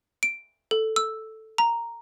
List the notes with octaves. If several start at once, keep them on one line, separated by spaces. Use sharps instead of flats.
D7
A4
E6
A#5